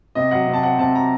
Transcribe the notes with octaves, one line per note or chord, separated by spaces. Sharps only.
C3 D#5
F#3 F#5
C3
A5
C4 F#5
C3 A5
F#3 A#5